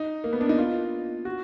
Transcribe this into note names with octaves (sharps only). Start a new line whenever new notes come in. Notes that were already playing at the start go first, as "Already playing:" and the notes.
Already playing: D#4
A#3
B3
D4
D#4
F4
F#4